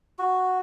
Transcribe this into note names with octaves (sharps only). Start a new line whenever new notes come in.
F#4